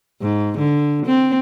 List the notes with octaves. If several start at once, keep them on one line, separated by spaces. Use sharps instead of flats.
G#2
D3
C4